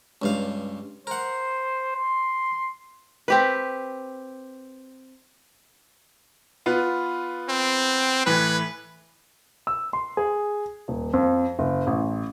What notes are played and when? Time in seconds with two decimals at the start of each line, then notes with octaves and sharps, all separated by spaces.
0.22 C#2 G2 F5
1.07 A#4 C5 F#5
1.96 C6
3.28 C4 G4 B4
6.66 B3 F4 B4
7.49 C4
8.26 A2 E3 B4
9.67 E6
9.93 C6
10.17 G#4
10.88 D#1
11.13 F2
11.59 F#1
11.87 A1